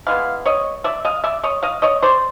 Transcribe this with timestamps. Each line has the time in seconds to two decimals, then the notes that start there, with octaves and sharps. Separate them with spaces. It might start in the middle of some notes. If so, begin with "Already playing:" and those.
0.07 E3 G#3 B3 F5
0.46 C#5 D#5
0.84 D5 E5
1.05 D#5 F5
1.24 D5 E5
1.44 C#5 D#5
1.63 D#5 F5
1.82 C#5 D#5
2.02 C5 D5